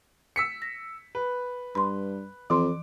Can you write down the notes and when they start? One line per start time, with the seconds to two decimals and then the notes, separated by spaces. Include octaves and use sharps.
0.36 E6 B6 C#7
0.62 A#6
1.15 B4
1.75 G2 B5 C6
2.50 F2 E3 C6 D6